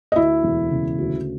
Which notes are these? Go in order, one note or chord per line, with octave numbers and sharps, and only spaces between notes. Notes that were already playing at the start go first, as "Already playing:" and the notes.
D#5
D2 E4 E5
E1
C#3
D2